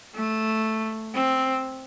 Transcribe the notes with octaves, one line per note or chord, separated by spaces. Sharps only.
A3
C4